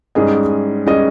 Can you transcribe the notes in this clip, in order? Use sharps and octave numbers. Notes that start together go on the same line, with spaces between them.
G#2 G3 C#4 G#4 D#5
G3 C#4 G#4 D#5